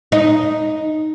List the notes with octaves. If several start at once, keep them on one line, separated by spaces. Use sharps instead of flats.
D#4